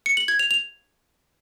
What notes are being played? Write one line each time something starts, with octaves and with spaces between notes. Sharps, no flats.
C#7
F#7
G#6
F7
F7